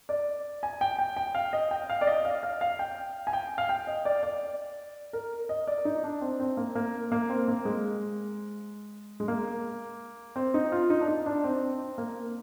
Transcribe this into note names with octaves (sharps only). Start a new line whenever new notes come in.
D5
G#5
G5
G5
G5
F5
D#5
G5
F5
D5
D#5
F5
F5
F5
G5
G#5
G5
F5
G5
D#5
D5
D5
A#4
D#5
D5
D#4
D4
C4
C4
A#3
A#3
A#3
C4
A#3
G#3
G#3
A#3
C4
D#4
F4
D#4
D4
D#4
D4
C4
A#3